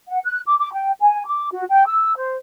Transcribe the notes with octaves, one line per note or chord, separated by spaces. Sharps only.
F#5
F#6
D6
D6
G5
G#5
D6
F#4
G5
E6
C5